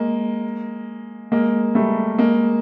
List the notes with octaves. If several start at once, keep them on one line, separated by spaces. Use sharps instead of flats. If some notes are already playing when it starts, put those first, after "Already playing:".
Already playing: G#3 A#3
G#3 A#3
G3 A3
G#3 A#3